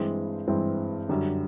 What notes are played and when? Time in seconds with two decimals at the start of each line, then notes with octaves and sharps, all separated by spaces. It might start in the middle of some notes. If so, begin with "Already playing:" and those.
Already playing: G2 E3 G#3 C4
0.47 G2 E3 G#3 C4
1.09 F#2 D3 G3